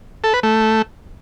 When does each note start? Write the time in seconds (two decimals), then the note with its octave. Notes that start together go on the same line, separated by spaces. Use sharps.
0.24 A4
0.33 B4
0.43 A3